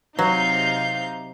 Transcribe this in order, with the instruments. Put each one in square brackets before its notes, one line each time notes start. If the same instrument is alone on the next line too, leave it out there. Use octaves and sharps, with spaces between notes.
[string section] C3 D#4 G6 [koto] F#3 [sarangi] F5